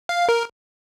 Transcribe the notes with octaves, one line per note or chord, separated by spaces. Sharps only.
F5
A#4